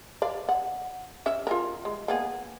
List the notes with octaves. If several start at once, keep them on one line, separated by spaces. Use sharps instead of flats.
D5 F5
F#5
C#4 E5
F4 G#4 A#4
G#3
A#3 B3 G#4